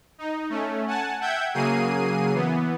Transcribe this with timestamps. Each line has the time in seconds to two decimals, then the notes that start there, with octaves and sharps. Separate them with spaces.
0.18 D#4
0.50 A3 C#4
0.87 F#5 G#5 A5
1.21 E5 F#5 G5 G6 G#6
1.54 C#3 F#3 A#3 G#4 C7 D#7
2.33 E3 B3